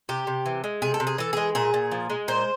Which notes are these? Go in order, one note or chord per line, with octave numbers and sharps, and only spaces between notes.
C3 G4
C3
E3
G#3
C3 G#4
A4
C3
G#4
E3 A4
G#3 G#4
A#2 G#4
A#2
F3
G#3
A#2 C5